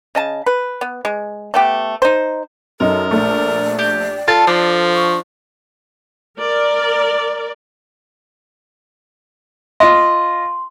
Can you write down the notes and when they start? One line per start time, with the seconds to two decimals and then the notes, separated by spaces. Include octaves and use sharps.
0.15 C#3 D#5 A5
0.46 B4
0.81 B3
1.05 G#3
1.54 A3 B3 G4
2.02 D#4 C5
2.80 F#2 D#4 A4 A#4
3.11 A#1 A3 D5
3.79 G4
4.28 F4 A4 A5
4.47 F3 D4 F4
4.94 C#6
6.38 A#4 D5
9.80 F4 D#5 C6